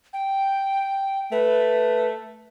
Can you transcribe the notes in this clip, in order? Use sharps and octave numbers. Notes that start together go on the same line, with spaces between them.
G5
A3 B4